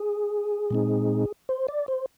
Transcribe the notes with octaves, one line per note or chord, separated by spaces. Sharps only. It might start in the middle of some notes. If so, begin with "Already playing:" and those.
Already playing: G#4
A#2 G#3 C4 D#4
C5
D5
C5